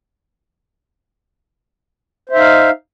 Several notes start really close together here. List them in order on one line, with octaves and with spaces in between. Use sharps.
C5 E5 D#4 F5